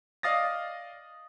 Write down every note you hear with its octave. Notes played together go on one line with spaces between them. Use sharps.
D5 D#5 F5 D#6 A6 A#6